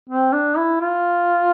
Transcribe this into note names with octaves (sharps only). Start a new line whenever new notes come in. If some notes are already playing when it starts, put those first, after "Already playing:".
C4
D4
E4
F4